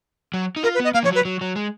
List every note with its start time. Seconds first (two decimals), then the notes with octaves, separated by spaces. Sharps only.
0.34 F#3
0.56 D#4
0.63 F4 A#4
0.75 B4
0.80 B3 D#5
0.94 A#3 F5
1.03 F3 C#5
1.09 F#3
1.15 B4
1.25 F#3
1.41 F#3
1.56 G#3